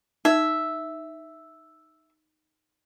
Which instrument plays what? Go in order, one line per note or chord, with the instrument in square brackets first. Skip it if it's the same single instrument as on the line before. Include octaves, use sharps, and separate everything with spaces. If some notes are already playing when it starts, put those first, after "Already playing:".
[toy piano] D#4 [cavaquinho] E5